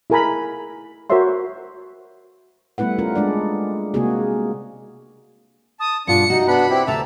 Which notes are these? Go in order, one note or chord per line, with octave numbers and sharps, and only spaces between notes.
E4 G#4 A#4 G#5 A#5 B5
F#4 A#4 C5 C#5 E5 C6
G3 A3 B3 E4 B4 F#5
C#4 F4 A#4
G#3 D4 D5
C3 G#3 A#3 C4 F#4 G#4
A5 D#6
G2 B2 D4 F4 C#7
C3 D#4 F#4
B3 D4 F#5 B5
C4 E4 G4
D2 C3 E5 A5 A#5